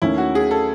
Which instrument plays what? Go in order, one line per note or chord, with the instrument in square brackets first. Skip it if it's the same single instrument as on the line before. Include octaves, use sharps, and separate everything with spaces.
[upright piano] D#2 D#3 A3 C#4 [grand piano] E4
[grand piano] F#4
G#4
A4